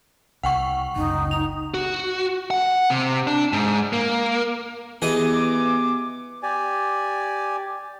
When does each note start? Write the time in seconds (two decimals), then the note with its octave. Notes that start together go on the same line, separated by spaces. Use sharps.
0.43 C2 F#5 G5 C#6
0.96 F#1 C#2 D#4
1.31 F7
1.74 F#4
2.51 F#5
2.90 C3
3.27 D4
3.53 G#2
3.93 A#3
5.02 E3 B3 G4 G#4 D#5 D6
6.43 G4 D5 G#5